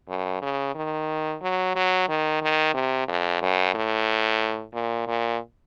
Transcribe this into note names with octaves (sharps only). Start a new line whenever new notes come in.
F#2
C#3
D#3
F#3
F#3
D#3
D#3
C3
F2
F#2
A2
A#2
A#2